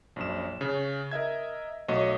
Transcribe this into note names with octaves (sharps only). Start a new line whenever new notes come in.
A#1 F#2 E7
C#3
A#4 D#5 E5 G#6
B1 A3 F#4 C#5 D#5